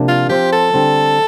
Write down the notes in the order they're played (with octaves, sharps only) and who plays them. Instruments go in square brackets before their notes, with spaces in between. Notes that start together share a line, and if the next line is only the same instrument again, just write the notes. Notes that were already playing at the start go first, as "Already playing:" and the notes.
Already playing: [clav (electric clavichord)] C3 F3 A#3 D4
[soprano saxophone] F4
[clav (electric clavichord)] F3 C4 F4 C5 [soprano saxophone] G4
[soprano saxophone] A4
[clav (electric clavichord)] D3 G3 C4